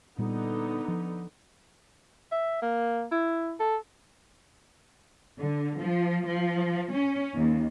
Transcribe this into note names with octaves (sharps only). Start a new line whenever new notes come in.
A#2 D3 G3 B3 D#4
F3
E5
A#3
E4
A4
D3
F3
F3
C#4
D#2